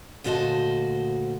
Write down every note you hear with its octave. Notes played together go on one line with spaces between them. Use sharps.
D2 A#2 F#4 C5 D#5 A5